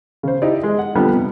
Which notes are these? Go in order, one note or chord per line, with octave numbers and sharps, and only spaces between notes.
C#3 C5
D#4 E4 G4 D5
G#3
F#5
F2 A#2 D3 G3 B3 D4
C3